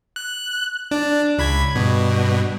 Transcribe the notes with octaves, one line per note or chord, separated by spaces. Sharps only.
F#6
D4
C#2 B5 G#6
G2 B2